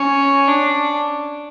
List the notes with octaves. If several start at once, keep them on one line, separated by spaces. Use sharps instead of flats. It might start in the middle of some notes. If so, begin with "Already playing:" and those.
Already playing: C#4
D4